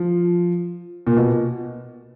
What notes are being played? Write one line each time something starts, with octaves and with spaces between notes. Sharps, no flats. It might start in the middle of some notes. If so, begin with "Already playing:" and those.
Already playing: F3
A#2
B2